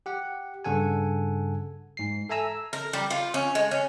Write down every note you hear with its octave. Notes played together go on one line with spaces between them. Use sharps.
G4 F#5
G2 C#3 A4 F#5 G#5
G#2 C7
A4 E5 G#5 A#5 E6
A#4
G3
F4
C#4
G#3
C#4